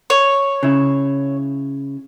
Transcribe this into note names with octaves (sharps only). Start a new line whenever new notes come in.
C#5
C#3 E4